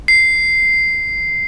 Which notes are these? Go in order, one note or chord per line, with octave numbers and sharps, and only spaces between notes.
C7